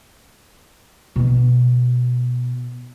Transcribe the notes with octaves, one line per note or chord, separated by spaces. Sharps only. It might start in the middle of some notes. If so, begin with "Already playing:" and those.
B2 B3